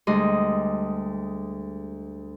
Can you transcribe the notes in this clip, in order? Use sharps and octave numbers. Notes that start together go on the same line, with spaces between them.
D2 G3 G#3 G#4 D#5 C6